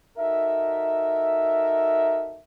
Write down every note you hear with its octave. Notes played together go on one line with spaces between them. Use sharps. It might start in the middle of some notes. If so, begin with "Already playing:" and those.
D#4 F#4 A4 A#4 E5